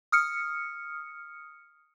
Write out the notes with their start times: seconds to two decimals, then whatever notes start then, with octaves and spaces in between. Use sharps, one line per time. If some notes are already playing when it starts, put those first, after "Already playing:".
0.12 D#6 F6 C#7